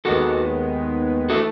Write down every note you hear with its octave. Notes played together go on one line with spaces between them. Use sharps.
D#2 D#3 G#3 B3 F#4 A4
E3 A3 F#4 A4